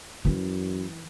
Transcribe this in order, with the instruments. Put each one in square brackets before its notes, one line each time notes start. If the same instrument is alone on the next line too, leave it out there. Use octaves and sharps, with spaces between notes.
[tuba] F#2 [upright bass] E3 E4